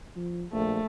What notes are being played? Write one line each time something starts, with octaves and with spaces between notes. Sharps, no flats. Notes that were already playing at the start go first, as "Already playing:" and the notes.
F3
A#1 A3